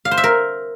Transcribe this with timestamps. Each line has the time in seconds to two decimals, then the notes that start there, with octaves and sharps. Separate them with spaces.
0.05 F5
0.11 C5
0.17 E5
0.24 A#4